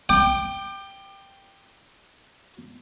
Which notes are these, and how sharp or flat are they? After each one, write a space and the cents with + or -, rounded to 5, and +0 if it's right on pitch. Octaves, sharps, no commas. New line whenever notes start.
G5 +0 D6 +30